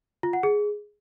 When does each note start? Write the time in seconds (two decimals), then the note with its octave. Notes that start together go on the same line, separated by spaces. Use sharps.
0.23 F4
0.33 F#5
0.43 G#4